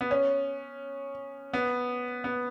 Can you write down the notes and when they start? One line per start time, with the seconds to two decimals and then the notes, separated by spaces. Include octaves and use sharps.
0.01 B3
0.11 C#4
1.53 B3
2.24 B3